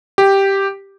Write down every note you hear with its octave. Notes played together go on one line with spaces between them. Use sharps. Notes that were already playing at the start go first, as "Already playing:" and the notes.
G4